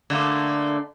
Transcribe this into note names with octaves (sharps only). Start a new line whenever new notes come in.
D3 A3 A#3